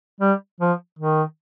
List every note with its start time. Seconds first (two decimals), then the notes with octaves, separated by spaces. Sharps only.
0.21 G3
0.60 F3
0.99 D#3